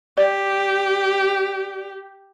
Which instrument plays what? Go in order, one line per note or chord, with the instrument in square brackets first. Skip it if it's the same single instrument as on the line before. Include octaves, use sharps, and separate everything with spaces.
[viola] G4 [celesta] D5